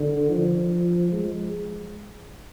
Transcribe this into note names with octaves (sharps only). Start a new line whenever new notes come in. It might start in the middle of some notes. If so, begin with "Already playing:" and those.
Already playing: D3
F3
G#3